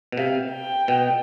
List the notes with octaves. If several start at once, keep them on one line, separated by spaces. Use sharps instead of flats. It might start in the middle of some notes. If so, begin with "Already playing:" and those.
B2
C3 F5
G5
B2